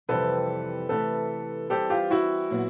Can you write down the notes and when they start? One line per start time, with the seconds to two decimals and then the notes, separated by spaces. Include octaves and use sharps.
0.09 F2 C3 E3 G3 A4 B4
0.89 C3 E3 A3 A4 B4
1.70 E3 G3 C4 G4 A4
1.90 F4 G4
2.11 E4 F#4
2.51 A#2 F#3 B3